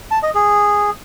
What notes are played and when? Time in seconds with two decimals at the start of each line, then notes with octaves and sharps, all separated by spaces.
0.11 A5
0.23 D#5
0.34 G#4